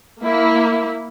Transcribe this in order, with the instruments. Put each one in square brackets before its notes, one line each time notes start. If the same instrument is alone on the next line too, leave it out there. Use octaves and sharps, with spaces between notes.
[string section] A#3 E4